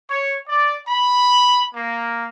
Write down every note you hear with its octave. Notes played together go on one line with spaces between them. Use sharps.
C#5
D5
B5
A#3